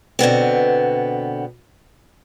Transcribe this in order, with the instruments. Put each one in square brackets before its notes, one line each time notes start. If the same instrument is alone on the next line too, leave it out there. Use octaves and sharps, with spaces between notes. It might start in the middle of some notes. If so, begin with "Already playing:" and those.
[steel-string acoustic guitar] B2 D3 B3 C4